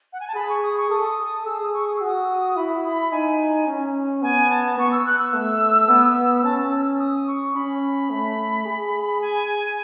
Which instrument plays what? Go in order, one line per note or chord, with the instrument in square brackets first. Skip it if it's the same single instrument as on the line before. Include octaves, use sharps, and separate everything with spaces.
[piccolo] F#5
G#5
A5
[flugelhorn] G#4 [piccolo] B5
[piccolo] C#6
D#6
C#6
[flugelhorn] A4 [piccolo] D#6
[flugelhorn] G#4 [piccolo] E6
[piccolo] D#6
C#6
D#6
[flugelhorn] F#4 [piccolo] E6
[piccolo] D#6
[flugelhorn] E4 [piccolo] B5
[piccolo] B5
[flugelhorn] D#4 [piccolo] G#5
[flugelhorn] C#4
[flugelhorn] B3 [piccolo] G#5
[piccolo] A5
[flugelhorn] B3 [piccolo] C#6
[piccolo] E6
F#6
E6
[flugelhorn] A3
B3
[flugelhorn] C#4 [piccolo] A5
[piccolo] E6
E6
E6
D#6
C#6
[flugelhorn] C#4 [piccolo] B5
[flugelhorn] A3
G#4
[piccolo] G#5